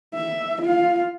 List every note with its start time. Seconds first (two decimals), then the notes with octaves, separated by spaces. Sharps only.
0.15 E5
0.62 F4 F5